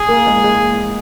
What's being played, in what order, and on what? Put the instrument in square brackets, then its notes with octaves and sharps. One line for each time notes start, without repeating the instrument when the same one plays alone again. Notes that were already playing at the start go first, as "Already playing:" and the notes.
Already playing: [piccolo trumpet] G#4
[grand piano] A#3
G#3
G#3